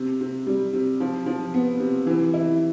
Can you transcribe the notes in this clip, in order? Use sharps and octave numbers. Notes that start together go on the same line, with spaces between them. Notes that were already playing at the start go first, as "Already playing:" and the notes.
Already playing: C3
C3
G3
C3
F3
F3
B3
C3
E3
E4